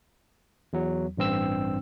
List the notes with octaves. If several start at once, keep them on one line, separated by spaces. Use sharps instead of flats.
E2 F#3
A1 G2 C4 E6